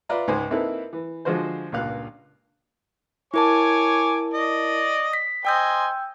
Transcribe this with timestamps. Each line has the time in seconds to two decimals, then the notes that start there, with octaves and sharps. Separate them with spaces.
0.09 F4 B4 D5 E5 A#5
0.28 C#2 G#2 C5 G#5
0.51 A#3 C4 D#4 E4 A4 B4
0.93 E3
1.25 D3 F3 G#3 F4 F#4 C5
1.72 C#2 G2 A#2 F5 F#6
3.34 E4 A#4 C#5 G#5 A5 D6
4.34 D5 D#5
5.13 B6
5.45 C5 D#5 G5 G#5 E6 G6